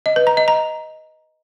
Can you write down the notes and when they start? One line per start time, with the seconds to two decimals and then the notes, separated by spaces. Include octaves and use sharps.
0.06 D#5
0.16 B4
0.27 A#5
0.37 D#5
0.48 A#5